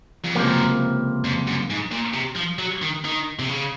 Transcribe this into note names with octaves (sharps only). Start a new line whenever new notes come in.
F2
C#2 F#2 C3 F3 A#3
F2
F#2
G#2
A#2
C3
F3
F#3
D#3
D#3
C3
C#3